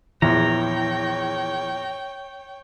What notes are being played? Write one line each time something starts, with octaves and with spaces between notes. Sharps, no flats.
A#1 E2 E3 C#5 G5 A#5